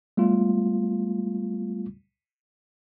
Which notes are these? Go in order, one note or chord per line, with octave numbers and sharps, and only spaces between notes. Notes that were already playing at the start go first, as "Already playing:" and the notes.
G3 A3 B3 F4